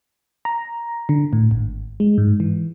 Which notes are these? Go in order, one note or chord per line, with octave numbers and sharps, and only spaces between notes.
A#5
D3
A2
G#1
G#3
G#2
E3